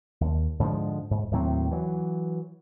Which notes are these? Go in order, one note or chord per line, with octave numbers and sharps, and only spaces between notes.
D#2
G#2 D3 F3 G#3
G#2
D#2 A2 F#3 C4
E3 F#3